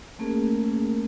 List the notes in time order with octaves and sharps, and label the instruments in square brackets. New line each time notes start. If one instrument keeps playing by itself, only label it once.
[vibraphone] A3 A#3 C#4 G#4 A#4